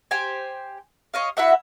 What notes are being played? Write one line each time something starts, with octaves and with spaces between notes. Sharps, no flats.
G4 C5 G5 G#5
C#5 D#5 F5
E4 F#4 E5 F#5